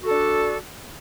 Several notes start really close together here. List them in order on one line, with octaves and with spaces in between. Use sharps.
F#4 A4 D4